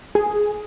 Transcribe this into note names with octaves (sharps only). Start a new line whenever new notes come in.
G#4